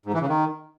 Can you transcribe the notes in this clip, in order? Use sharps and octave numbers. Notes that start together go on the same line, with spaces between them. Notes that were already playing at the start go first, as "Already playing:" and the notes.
G#2
E3
C#3
D#3